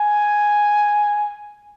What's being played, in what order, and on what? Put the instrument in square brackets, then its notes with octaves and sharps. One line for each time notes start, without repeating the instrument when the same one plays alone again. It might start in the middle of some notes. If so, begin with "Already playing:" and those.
Already playing: [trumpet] G#5